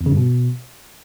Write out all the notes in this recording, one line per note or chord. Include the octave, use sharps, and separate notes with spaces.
E2
C#3
G2
B2